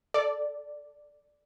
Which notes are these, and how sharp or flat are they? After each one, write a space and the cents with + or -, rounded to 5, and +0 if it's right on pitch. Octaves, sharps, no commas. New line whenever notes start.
A4 +0 D5 +0